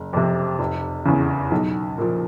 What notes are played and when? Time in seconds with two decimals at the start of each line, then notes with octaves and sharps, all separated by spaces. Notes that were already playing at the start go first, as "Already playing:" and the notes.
Already playing: F#1
0.13 F2 C3
0.59 F1
1.05 E2 C#3
1.51 B1
1.98 A#2 F3